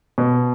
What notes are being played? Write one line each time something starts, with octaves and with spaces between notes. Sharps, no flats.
B2